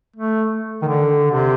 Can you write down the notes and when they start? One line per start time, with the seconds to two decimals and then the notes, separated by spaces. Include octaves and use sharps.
0.16 A3
0.82 D#3
0.88 D3
1.31 C3